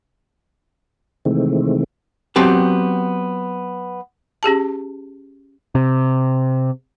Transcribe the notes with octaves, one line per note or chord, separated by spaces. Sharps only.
C3 D#3 E3 G#3 A3 C4
F#3 B3 C4 G4 A5
C#4 G4 G#4 A5
C3